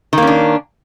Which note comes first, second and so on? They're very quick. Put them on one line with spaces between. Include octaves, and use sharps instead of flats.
D#3 A#3 C#4 D4